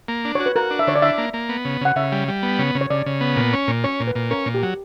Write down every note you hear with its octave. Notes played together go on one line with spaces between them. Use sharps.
A#3
D4
F#4 C#5
B4
F#4 A#4
D4
E5
D3 C#5
D5
D4 E5
A#3
A#3
B3
C#3
C#3 F#5
C#3 E5
G3
G3
B3
C#3
C#3
C#5
C#3 D5
C#3
B3
A#2
C#4
A#2
C#4 C#5
A#2
B4
A#2
C#4 A#4
A#2
G4
F#3